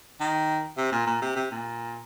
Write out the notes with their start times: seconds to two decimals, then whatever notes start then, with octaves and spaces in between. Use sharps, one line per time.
0.20 D#3
0.77 C3
0.92 A#2
1.07 A#2
1.22 C3
1.36 C3
1.51 A#2